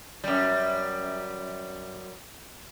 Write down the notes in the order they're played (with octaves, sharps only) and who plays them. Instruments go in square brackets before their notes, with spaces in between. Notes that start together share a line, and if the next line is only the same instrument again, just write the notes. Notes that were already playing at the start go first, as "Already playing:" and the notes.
[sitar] F#2 G3